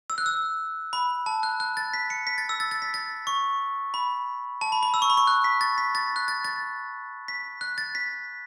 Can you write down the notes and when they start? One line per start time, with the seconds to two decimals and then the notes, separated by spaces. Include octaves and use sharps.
0.10 E6
0.18 F#6
0.26 E6
0.93 B5
1.26 A5
1.43 F#6
1.60 F#6
1.77 A6
1.94 B6
2.10 C#7
2.27 B6
2.38 A6
2.49 E6
2.60 A6
2.71 A6
2.82 B6
2.94 A6
3.27 C#6
3.94 B5
4.61 A5
4.72 B5
4.83 B5
4.94 E6
5.02 C#6
5.10 B5
5.17 C#6
5.27 F#6
5.44 B6
5.61 A6
5.78 B6
5.95 A6
6.16 F#6
6.28 A6
6.44 A6
7.28 B6
7.61 F#6
7.78 A6
7.95 B6